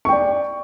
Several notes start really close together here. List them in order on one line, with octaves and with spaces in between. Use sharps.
C#6 G5 D5